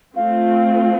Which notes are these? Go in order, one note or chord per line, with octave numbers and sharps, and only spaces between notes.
A3 C4 F4 F5